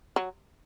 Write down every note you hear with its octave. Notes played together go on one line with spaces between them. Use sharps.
F#3